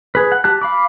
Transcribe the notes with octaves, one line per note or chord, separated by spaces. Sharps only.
G#4 B4
F#5
G4 A5 F#6
F5 B5 D6